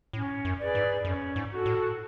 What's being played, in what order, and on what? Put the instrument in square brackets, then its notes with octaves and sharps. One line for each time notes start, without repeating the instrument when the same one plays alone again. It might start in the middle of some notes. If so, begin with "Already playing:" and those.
[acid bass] A2 [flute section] C#4
[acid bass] F#2
[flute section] G#4 B4 D5
[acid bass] G#2
[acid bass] F#2 [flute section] C#4
[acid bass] G#2
[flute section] F#4 A4
[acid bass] A2